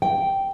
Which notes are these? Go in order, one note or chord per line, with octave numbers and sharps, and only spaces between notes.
G5